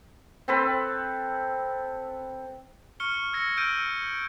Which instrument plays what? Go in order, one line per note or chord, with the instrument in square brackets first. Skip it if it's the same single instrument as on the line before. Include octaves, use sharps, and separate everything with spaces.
[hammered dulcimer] C4 A4 B4
[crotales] C#6 F6 C#7 G7
E6 G#6 A#6 C#7
E6 F6 G6 D7 D#7